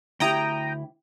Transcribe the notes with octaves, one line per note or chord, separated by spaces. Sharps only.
D2 E4 G4 G5 A#5 D#6